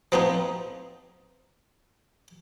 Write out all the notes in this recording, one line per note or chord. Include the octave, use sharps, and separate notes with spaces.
F3 B3 C4 D#4